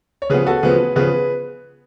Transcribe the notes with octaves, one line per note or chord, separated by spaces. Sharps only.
C#5
C#3 F3 B3 G#4 B4
F#4 A4
C#3 F3 B3 G#4 B4
C#3 F3 B3 G#4 B4